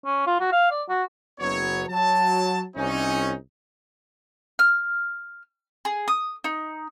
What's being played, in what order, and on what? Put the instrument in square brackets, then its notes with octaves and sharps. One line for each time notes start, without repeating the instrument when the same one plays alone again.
[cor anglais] C#4
F4
F#4
F5
D5
F#4
[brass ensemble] F#1 F#3 B3 C#5
F#3 A5
C2 C#4 D#4
[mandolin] F6
G#4
D#6
D#4